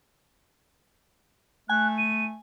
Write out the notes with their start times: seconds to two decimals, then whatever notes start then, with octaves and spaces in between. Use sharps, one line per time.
1.69 A3 G#5 F#6
1.98 D#7